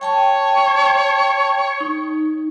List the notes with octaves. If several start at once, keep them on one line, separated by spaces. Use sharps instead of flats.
C#5 G5 A5 C#6
D#4